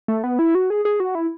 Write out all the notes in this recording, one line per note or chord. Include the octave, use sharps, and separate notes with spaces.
A3
B3
E4
F#4
G#4
G#4
F#4
E4